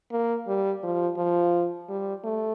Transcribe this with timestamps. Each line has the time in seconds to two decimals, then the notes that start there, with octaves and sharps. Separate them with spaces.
0.12 A#3
0.47 G3
0.83 F3
1.17 F3
1.89 G3
2.24 A3